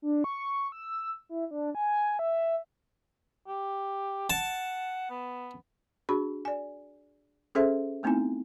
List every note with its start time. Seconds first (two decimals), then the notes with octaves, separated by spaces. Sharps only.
0.02 D4
0.24 C#6
0.72 E6
1.29 E4
1.51 D4
1.75 G#5
2.19 E5
3.47 G4
4.30 F#5 A5
5.10 B3
6.09 D4 F#4 G#4 B5
6.45 D5 G#5
7.55 C#4 G#4 A4 C5 E5 C6
8.03 A3 B3 C4 D#4 E4 G#5